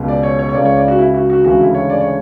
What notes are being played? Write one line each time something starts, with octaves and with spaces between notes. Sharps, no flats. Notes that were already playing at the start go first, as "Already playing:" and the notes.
Already playing: C#2 B2 G#3
D5
C#5
C#5
C#5
C#2 C#3 G#3 D5
C#5
D5
F#4
E4
F#4
F#4
D2 C#3 E3 G#3 F#4
E4
C#5
D5
C#5